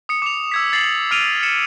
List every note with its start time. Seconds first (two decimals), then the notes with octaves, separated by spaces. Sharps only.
0.09 D#6 C#7
0.22 D6 F7
0.52 E6 G#6 B6
0.73 A6 C7 F#7
1.11 E6 F6 D7 D#7 F7
1.43 C#7 E7